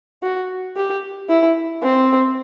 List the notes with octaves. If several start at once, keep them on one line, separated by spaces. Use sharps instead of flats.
F#4
G4
E4
C4